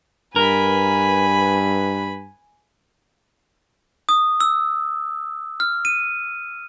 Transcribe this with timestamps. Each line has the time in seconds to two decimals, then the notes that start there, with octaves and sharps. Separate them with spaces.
0.36 G2 A#4 B4 G#5 B5
4.09 D#6
4.41 E6
5.60 F6
5.85 D#7